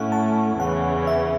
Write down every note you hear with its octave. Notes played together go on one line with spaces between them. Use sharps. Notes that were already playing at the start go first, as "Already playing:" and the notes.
Already playing: A2 A3 C#4 E4 F#5
A5
E2 C#3 E3 C#4 F#5
E5